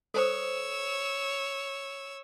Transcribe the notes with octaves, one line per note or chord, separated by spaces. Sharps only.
A4 C5 C#5 D#6 E6